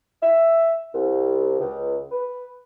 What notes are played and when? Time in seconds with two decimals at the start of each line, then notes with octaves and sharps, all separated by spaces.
0.23 E5
0.94 C2
1.59 C#2
2.11 B4